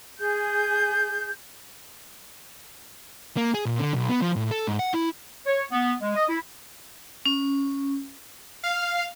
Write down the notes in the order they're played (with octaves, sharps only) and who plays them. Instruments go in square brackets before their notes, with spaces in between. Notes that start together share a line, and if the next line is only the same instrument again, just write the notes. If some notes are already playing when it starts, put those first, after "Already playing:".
[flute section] G#4 G6
[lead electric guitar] A#3
G#4
A#2
D3
B1
B3
F3
A2
A4
G#2
F#5
E4
[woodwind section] C#5
B3
G#3
D#5
E4
[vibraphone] C#4
[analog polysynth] F5